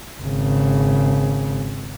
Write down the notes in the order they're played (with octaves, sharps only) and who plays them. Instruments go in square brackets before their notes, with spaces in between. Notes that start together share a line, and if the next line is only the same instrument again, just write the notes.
[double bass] G#1 C#3